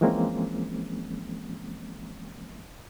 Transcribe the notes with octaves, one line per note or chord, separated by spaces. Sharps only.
E3 F3 G#3 A#3 C4 C#4